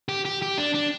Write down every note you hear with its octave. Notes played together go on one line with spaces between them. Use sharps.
G4
G4
G4
D4
D4